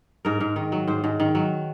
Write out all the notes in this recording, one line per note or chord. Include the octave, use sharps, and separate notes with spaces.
G#2 A#4
G#2
D#3
F#3
G#2 C5
G#2
D#3
F#3